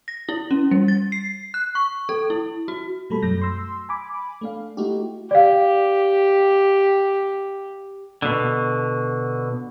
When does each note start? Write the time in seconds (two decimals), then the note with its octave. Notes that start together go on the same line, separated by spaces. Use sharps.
0.08 A#6
0.29 E4
0.51 C#4
0.71 G3
0.88 A6
1.12 C7
1.54 F#6
1.75 C#6
2.09 A4
2.30 E4
2.68 F#4
3.10 B2 G3 A3 A4 B5
3.22 F#2 F#3 G6 A#6
3.42 C6 E6
3.89 G#5 B5 D6
4.41 A3 D4 F5
4.77 A3 D#4 E4 F#4 G4
5.31 G4 D5 F5
8.22 B2 D3